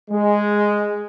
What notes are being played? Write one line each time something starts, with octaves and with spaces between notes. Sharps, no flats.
G#3